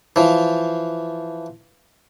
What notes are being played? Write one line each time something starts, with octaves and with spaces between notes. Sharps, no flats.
E3 F3